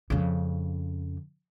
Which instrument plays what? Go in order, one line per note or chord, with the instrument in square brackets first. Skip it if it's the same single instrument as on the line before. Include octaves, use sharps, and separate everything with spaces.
[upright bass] F2 C#3